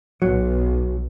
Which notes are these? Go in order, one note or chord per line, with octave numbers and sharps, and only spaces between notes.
B1 F#3